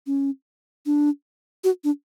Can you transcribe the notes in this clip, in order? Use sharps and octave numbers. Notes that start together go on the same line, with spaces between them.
C#4
D4
F#4
D4